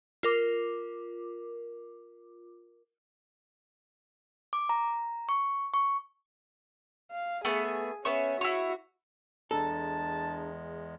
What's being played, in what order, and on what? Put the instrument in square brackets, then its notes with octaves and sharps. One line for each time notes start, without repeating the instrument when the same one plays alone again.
[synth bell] F4 A#4 D6
[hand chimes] D6
A#5
C#6
C#6
[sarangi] F5
[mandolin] A3 B3 C#6 [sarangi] G#4
[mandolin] B3 E5 C#6 [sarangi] C#4
[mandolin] E4 C#5 [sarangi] F#4
[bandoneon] E2 G#3 [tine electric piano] D4 A#5 [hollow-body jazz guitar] A4 [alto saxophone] A5